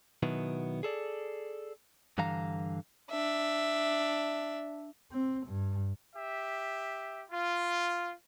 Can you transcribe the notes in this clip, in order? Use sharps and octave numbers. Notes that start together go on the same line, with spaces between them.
B2 D#3 F#3 B3 E4
G#4 A4 D5
G2 D3 E3 F5 A#5
D4 E5
C4
G2
G4 E5
F4